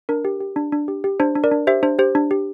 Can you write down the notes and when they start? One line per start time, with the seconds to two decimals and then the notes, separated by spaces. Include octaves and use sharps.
0.09 D4 A#4
0.25 G4
0.40 G4
0.56 D4
0.72 D4
0.88 G4
1.04 G4
1.20 D4 C5
1.35 D4
1.44 A#4 D5
1.51 D4
1.67 G4 C5 E5
1.83 D4 C5
1.99 G4 C5
2.15 D4
2.31 G4